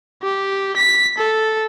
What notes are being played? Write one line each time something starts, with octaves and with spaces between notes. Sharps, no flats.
G4
B6
A4